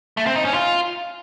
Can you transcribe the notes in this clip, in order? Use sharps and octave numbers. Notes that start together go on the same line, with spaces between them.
A3
C4
D#4
C#4
F4